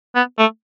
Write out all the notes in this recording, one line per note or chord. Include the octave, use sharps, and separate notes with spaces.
B3
A3